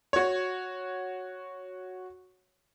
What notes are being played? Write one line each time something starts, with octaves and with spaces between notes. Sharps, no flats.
F#4 C#5